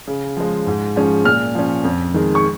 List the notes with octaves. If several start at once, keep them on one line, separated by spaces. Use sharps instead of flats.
C#3
F3 G#3
G#2
F3 G#3 C#4
A#2 F6
F3 C#4
F2
D#3 G#3
C#6